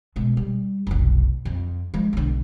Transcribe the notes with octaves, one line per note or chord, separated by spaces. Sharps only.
B2 G#3
G3
F1 B1
F2
F3 G#3
B1 D3